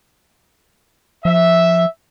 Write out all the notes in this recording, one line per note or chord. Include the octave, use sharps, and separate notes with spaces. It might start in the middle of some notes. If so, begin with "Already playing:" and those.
F3 E5